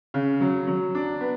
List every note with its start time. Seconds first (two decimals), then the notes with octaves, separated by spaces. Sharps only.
0.14 C#3
0.40 F#3
0.67 F#3
0.95 D4
1.20 B3